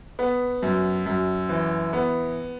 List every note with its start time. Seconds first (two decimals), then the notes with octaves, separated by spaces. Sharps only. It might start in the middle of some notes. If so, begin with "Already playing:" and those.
0.19 B3
0.63 F#2
1.06 F#2
1.49 E3
1.93 B3